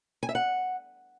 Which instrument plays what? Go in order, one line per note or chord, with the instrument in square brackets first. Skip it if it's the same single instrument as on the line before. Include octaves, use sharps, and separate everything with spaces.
[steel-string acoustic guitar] G#5
E5
F#5